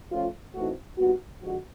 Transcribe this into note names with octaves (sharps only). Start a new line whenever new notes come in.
F3 A3 C#4 F4
A2 E3 A3 C4 D#4 F#4
A#2 G3 B3 D#4 F#4
D3 F3 G#3 F#4